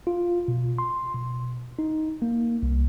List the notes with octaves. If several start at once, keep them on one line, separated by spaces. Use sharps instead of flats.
F4
B2
C6
B2
D#4
A#3
C2